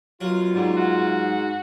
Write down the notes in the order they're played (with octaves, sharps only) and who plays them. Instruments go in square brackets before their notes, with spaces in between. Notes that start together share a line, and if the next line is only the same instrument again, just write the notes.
[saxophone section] F#2 B2 F4 [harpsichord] F#3
[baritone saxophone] G#2 [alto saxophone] G3
[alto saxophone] F#4